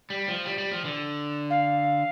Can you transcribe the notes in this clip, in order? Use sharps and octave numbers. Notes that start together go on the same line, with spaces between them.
G3
F3
G3
G3
F3
D3
F5